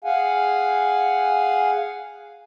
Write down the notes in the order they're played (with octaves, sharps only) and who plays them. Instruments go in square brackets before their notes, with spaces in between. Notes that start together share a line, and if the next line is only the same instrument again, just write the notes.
[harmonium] G#4 F5 F#5 G#5